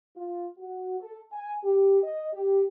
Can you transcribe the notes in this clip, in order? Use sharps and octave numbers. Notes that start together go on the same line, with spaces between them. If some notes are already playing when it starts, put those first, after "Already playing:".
F4
F#4
A4
G#5
G4
D#5
G4